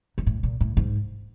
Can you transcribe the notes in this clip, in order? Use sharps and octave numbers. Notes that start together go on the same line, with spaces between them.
G#2
A2
A#2
A2
G#2